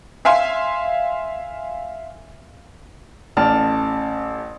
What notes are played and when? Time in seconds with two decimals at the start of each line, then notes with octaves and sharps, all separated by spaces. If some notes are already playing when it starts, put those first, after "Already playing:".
0.25 E5 F5 G#5 C6
3.37 A1 D5 A5 F6